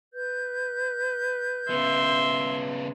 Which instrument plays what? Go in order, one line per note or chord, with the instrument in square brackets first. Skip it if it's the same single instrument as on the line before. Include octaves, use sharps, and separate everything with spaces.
[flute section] B4 G6
[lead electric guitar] C#3 B3 [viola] E5 C6